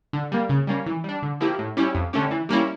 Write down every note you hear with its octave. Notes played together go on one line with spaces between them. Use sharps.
D3
G3 A#3
C#3
G3 A#3 C#4
E3
G3 D4
D3
F3 A#3 E4 G4
A2
G3 C#4 E4 G4
F2
D3 A3 C#4 G4
E3
G3 A#3 C#4 E4